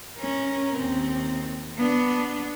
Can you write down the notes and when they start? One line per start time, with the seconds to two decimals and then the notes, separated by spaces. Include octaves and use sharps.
0.19 C#4 A#4
0.76 D#2 C4
1.78 B3 D4